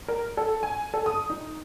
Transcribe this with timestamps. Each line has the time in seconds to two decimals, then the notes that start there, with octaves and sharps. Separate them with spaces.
0.08 A#4
0.37 A4
0.63 G#5
0.94 A4
1.06 D#6
1.30 D#4